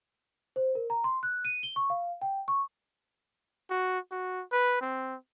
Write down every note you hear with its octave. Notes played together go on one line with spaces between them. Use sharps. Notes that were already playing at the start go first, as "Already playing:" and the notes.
C5
A#4
A#5
C6
F#6
D#7
G7
C#6
F5
G5
C#6
F#4
F#4
B4
C4